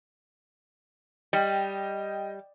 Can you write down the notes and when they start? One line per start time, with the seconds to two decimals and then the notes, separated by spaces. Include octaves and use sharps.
1.33 G3 D#5 G5